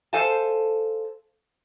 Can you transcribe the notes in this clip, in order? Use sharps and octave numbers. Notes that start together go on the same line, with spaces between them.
A4 C5 F5 G#5 A5